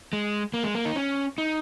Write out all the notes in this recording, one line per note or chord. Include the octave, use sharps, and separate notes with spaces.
G#3
A#3
G#3
A#3
D#4
C#4
D#4